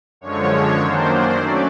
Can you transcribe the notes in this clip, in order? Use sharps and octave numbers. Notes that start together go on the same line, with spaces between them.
F#2 D3 F3 G#3 C#5
F#2 D#3 F#3 A#3 D4 C5
F#3 A3 C#4 D5